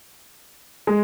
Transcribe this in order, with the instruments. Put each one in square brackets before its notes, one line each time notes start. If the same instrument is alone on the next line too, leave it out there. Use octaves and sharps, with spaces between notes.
[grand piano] G#3